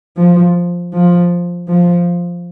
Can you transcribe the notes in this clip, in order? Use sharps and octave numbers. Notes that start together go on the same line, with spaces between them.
F3
F3
F3